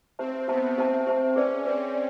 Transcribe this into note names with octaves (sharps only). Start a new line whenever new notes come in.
C4 G4 C5 E5 A5
B3 G4 C5 E5 A5
C4 G4 C5 E5 A5
G4 C5 E5 A5
C#4 G#4 B4 D5
C4 G#4 B4 D5
D5